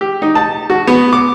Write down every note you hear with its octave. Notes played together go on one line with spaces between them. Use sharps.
G4
D#4
A5
F#4
B3
D6